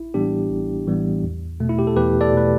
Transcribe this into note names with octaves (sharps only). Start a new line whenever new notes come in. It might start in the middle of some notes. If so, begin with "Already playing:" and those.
Already playing: A1 E4
A2 E3 G3 B3 D4 G4
A1
A2 E3 G3 B3
E2
B2 A3
E4
G4
A4
E2 G4 B4
A4 D5
B2 A3 B4